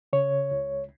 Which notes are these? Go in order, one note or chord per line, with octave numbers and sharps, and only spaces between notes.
C#3 C#5
C#2